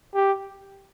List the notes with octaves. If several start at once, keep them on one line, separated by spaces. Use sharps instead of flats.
G4